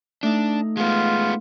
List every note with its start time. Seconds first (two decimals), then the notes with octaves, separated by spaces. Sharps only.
0.23 A3 D4 D#4
0.77 G#3 B3 F4